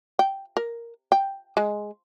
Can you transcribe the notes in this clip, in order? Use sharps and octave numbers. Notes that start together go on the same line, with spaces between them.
G5
A#4
G5
G#3